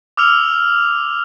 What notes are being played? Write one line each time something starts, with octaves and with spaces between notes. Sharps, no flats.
D6 E6 F6 F7